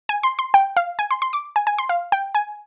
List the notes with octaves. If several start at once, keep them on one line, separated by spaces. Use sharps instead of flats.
G#5
C6
C6
G5
F5
G#5
C6
C6
D6
G#5
G#5
C6
F5
G5
G#5